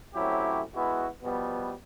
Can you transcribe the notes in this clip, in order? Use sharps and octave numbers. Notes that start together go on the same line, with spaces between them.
F#3 A3 C4 C#4 E4 G4
G#3 B3 E4 F#4
B2 F3 G3 B3